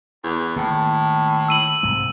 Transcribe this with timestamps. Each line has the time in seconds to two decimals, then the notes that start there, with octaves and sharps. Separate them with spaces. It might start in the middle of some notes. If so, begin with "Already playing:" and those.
0.23 E2
0.56 A2 D#3 A#3
1.48 E6 D#7 F#7
1.83 G#2 C3 G#3